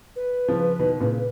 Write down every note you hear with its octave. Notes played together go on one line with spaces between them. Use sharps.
B4
C#3 F3
B2 D#3
A#2 C#3